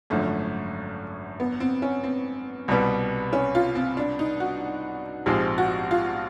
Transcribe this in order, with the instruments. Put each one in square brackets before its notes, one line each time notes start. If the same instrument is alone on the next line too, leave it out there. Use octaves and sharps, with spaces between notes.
[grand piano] G#1 F#2 D3 F3 [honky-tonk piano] A3
[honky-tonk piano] B3
C4
C#4
C4
[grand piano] C2 B2 G3 B3
[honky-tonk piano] C#4
F4
C4
D4
D#4
F#4
[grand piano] A#1 G#2 F3 G#3 C4 [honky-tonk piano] G4
[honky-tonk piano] F#4
F4